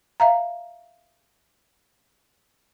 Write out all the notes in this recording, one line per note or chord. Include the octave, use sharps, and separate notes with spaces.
E5 F5 A#5